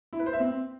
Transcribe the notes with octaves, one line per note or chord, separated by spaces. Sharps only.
E4
B4
C5
E5
C4